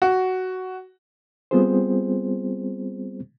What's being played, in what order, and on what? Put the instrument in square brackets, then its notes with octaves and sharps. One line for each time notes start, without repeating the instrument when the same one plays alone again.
[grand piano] F#4
[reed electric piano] G3 B3 C4 F4 G#4 C5